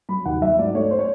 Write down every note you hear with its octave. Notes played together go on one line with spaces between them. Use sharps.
F#3 B5
D#2 F#5
F#3 E5
G#2 D5
A3 C#5
C5
C#5